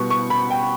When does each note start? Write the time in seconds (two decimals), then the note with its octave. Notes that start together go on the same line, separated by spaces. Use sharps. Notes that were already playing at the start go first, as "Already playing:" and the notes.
Already playing: B2 G3 B3 C#6
0.10 C#6
0.30 B5
0.50 G5